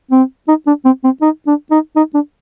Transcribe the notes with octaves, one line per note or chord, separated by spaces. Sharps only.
C4
D#4
D4
C4
C4
D#4
D4
D#4
D#4
D4